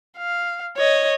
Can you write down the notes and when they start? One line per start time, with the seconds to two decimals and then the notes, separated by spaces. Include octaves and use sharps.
0.17 F5
0.77 C#5 D#5